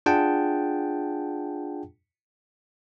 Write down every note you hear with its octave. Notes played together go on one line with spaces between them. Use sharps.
D4 F4 G#4 F#5 G5 A5